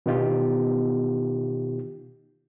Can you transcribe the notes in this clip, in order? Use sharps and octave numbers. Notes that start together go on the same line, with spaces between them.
B2 D#3 B3 D#4 F4 G4